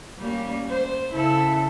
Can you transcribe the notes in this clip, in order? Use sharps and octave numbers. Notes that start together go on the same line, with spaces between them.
G3 A#3 C#4
C5
C#3 E4 A4